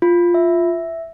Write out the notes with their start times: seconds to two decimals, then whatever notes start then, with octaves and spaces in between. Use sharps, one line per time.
0.02 F4
0.34 E5